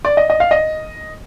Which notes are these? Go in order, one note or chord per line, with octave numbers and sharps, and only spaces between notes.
D5
D#5
D#5
F5
D#5